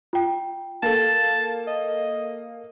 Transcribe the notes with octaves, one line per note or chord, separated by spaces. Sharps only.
F4 G5
A#3 A4 A5
D#5